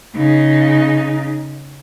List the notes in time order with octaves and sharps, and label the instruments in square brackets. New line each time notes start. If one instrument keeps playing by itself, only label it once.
[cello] C#3 D#4